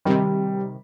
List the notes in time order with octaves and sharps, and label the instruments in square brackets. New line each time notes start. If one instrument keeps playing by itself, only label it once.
[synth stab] C3 D#3 [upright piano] G3